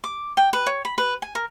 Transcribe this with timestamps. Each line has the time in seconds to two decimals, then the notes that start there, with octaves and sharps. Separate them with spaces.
0.04 D6
0.37 G5
0.53 B4
0.66 C#5
0.85 B5
0.98 B4
1.22 G#5
1.35 A#4